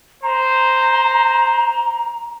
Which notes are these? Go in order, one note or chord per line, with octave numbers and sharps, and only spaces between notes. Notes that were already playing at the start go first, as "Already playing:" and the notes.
C5 A#5